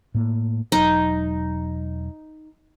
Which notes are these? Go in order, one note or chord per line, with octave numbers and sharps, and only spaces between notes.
A2 A#3
E1 F#3 D#4